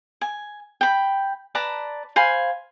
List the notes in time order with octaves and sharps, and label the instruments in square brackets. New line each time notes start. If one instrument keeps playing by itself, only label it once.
[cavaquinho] G#5
G5 B5
B4 D5 A5 A#5
C5 F5 G#5 B5